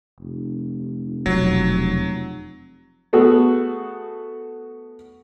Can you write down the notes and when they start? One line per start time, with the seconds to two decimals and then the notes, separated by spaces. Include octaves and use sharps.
0.20 F1
1.26 E1 F3 F#3
3.13 A3 B3 F#4 G#4 A4